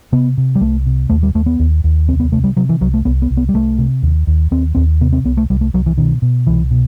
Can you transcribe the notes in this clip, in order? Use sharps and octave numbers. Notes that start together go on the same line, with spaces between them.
C3 B3
C3
G3
C2 A3
C3
D#2 A3
G3
D#2 A3
B3
D#2
D#2
C2 C4
B3
C3 A3
G3
C3 F#3
E3
C2 F#3
A3
C2 B3
B3
C2
B3
G3
C2 A3
C3
D#2
D#2
D#2 C4
D#2 C4
C3 B3
C4
C2 B3
A3
C2 G3
A3
C2 F#3
E3
B2 D#3
B2
C2 E3
B2